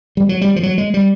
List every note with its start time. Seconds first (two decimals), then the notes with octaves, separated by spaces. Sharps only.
0.17 G3
0.29 F#3
0.41 G3
0.56 F3
0.63 F#3
0.78 G#3
0.94 G3